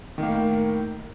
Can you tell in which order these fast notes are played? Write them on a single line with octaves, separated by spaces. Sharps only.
D#3 A#3 A2